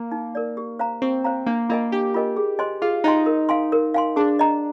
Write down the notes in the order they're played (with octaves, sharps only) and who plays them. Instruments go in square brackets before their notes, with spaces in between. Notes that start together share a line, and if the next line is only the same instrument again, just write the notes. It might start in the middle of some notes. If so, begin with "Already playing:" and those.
Already playing: [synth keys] A#3
[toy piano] D#4
A#4 D5
G4
C5 F5 A#5
[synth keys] C4 [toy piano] G4
[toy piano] C5 F5 A#5
[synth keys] A#3 [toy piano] D4
[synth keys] A#3 [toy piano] F4 A#4 D#5 G#5
[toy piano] D4 [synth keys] G4
[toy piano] F4 A#4 D#5 G#5
G#4
C5 D#5 G#5 C6
[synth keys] F4 [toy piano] G#4
[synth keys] D#4 [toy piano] C5 D#5 G#5 C6
[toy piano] A#4
F5 G#5 C6
A#4
F5 G#5 C6
[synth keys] D4 [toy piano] G#4
[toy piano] D#5 A#5